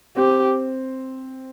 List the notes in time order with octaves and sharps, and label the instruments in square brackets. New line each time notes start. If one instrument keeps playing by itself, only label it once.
[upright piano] C4 [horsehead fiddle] G4